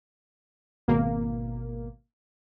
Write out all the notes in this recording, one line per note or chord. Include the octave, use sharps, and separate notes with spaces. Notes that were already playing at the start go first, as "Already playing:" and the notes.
G#1 B2 A#3